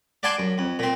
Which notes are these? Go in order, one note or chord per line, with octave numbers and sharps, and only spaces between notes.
D5 F#5 G#5 A5 C6 D6
F#2
F2
A#2 C4